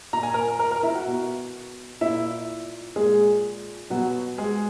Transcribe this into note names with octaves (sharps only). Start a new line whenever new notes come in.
A#2 A#5
G#5
A#4 A#5
A#4 A#5
A#4 A#5
E4 E5
F#4 F#5
B2
A#2 E4 E5
A#2 G#3 G#4
B2 F#3 F#4
G#3 G#4